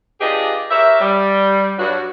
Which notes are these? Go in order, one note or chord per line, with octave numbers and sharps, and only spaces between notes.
D4 F4 G4 G#4 B4 D#5
G4 A#4 C#5 E5
G3
G2 F#3 F#4